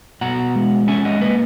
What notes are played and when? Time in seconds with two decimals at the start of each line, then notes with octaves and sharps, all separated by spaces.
0.21 B2 F#5 A#5
0.56 G#3
0.88 C#4 E5 G#5
1.05 D#5 F#5
1.21 A#3 B4 D#5